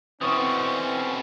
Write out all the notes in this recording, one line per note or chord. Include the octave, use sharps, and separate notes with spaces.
B2 D3 E3 C4 C#4 C#6 D#6